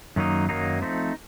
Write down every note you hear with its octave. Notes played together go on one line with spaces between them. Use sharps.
F#2 D#3 F#3 A#3 D#4
F#2 D#3 F#3 A#3 D#4
F3 A3 C4 D#4